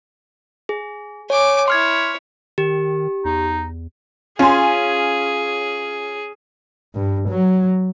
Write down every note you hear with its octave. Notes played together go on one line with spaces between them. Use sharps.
G#4
C#5 G#5 D6
E4 C#5 C6 F6 G#6
D#3 G4
E2 D#4
C#4 F4 G#4 G#5
G2
F#3